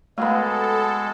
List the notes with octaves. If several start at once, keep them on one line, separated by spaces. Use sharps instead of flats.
F#3 G#3 A3 B3 A4